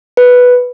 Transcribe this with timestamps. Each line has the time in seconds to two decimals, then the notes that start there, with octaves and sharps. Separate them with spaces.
0.17 B4